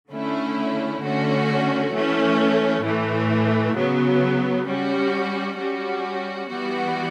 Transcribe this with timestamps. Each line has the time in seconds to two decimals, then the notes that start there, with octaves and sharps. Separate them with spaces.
0.11 D3 A3 C#4 E4
1.02 D3 A3 C#4 F#4
1.93 E3 A3 C#4
2.84 A2 E3 A3
3.76 C#3 F#3 B3
4.67 G3 C#4 F#4
5.58 G3 C#4 F#4
6.49 E3 G3 B3 F#4